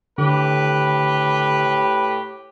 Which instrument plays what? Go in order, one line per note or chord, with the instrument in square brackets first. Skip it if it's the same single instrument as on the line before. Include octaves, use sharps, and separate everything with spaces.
[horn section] A2 G4 B4 [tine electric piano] D3